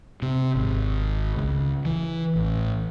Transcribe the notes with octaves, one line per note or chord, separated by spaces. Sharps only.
C3
G#1
C#2
E3
A1